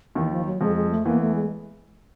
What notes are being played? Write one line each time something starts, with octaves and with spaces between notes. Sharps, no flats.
D#2 D#3 E3
F3
F#3
F2 F3 G#3
G#3
A3
E2 E3 A#3
A3
G#3